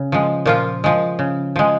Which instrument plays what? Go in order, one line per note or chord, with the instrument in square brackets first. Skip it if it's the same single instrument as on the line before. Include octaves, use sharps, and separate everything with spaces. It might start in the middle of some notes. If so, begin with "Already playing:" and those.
Already playing: [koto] C#3
F3 G#3
A#2 F3 F4
F3 G#3
C#3
F3 G#3